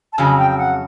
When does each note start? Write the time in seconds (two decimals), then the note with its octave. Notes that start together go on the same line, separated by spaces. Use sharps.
0.13 A5
0.18 F2 C#3 F#3 G#5
0.38 G5
0.51 G5
0.58 F#5